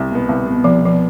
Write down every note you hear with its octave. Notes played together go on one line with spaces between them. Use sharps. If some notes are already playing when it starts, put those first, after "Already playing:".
Already playing: C2
B2 B3
C2
B2 B3
C2 F3
B2 F3 B3